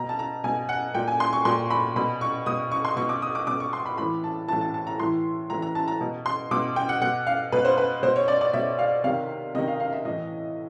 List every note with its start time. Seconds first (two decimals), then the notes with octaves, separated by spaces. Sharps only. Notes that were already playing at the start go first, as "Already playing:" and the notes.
Already playing: B2 A#5
0.09 A5
0.19 A#5
0.44 B2 G#5
0.69 F#5
0.94 A#2 G5
1.08 G#5
1.20 C6
1.33 C#6
1.45 A#2 C6
1.70 B5
1.96 B2 B5
2.21 C#6
2.46 B2 D#6
2.72 C#6
2.85 C6
2.97 B2 C#6
3.09 D6
3.22 D#6
3.35 D6
3.47 B2 D6
3.60 C#6
3.73 C6
3.86 B5
3.98 A2 E3 B5
4.24 A5
4.48 E3 A5
4.52 A2
4.61 A5
4.74 A5
4.87 A#5
4.99 A2 E3 C6
5.50 A2 E3 A#5
5.62 A#5
5.75 A5
5.88 A#5
6.01 B2
6.26 C6
6.51 B2 D6
6.76 G5
6.89 F#5
7.01 B2 F#5
7.27 F5
7.52 B2 B4
7.65 C5
7.78 B4
8.03 B2 C5
8.16 C#5
8.28 D5
8.41 D5
8.53 B2 E5
8.79 F5
9.04 C3 D#3 F5
9.54 C3 D#3 D#5
9.68 F5
9.80 F5
9.92 E5
10.05 A2 E3 D#5